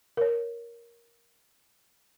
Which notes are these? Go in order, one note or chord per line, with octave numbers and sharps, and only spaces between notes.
A#4 C#5